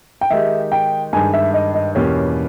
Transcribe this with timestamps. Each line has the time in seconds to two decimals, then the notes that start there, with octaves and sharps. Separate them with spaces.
0.21 G5
0.30 D#3 G#3 D#4 G4 E5
0.72 G5
1.13 G2 D#3 G#3 G#5
1.34 E5
1.54 D#5
1.74 D#5
1.95 E2 B2 A#3 C#4 G4 C#5